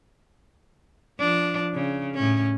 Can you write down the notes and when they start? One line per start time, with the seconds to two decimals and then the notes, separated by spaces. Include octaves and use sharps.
1.19 F3 D4
1.73 C#3
2.14 A2 C#4